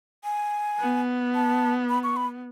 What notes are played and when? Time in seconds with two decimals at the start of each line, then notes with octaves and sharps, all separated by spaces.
0.24 G#5
0.79 B3
1.35 A5
1.89 B5
2.03 C#6
2.16 B5